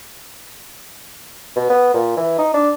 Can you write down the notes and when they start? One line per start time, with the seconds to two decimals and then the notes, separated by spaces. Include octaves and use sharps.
1.56 B2
1.70 B3
1.94 A#2
2.17 E3
2.39 D#4
2.54 D4